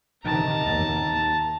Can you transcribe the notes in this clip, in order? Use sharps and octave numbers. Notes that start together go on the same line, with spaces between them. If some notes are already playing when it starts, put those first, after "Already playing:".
C3 D#3 A5 A#5
D#2